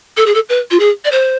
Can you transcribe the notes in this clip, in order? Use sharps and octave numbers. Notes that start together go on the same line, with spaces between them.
A4
G#4
A4
B4
F4
G#4
D5
C5